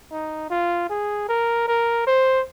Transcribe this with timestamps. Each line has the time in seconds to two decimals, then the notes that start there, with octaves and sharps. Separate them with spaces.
0.11 D#4
0.50 F4
0.89 G#4
1.29 A#4
1.68 A#4
2.07 C5